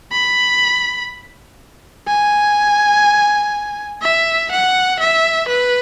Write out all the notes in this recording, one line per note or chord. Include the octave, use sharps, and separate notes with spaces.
B5
G#5
E5
F#5
E5
B4